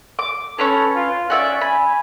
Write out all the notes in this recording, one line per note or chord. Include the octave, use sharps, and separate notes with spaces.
D6
C#4 A4 B4 C#5
F4
C#4 D5 E5 F#5
G#5 B5